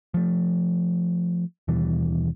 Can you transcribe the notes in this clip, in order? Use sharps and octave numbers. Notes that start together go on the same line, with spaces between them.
F3 A3
D#2 B2 E3 G3